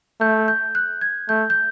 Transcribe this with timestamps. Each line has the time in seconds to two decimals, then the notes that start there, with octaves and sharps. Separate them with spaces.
0.20 A3 G6
0.48 G6
0.75 F#6
1.01 G#6
1.29 A3 G6
1.50 G6